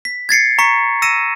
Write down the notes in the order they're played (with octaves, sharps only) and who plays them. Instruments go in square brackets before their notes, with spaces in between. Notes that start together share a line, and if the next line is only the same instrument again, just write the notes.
[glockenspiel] B6
G#6 A6 C7 C#7
A#5 C#6 B6 C#7
E6 A#6 C#7 D#7 E7